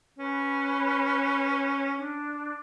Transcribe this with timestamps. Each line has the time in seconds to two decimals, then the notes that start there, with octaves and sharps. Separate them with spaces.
0.19 C#4 B4
1.97 D4